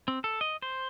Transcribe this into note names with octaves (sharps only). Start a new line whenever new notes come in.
C4
A4
D#5
C5